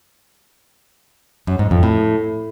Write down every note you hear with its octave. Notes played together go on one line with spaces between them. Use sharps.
F#2
G#2
F2
A2